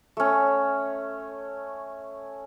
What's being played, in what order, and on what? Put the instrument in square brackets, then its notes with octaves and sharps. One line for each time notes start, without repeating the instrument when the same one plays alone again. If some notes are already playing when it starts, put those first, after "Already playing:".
[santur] A3 C#4